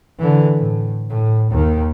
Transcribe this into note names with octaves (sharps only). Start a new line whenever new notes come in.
D3 E3
A2
A2
D#2 D#3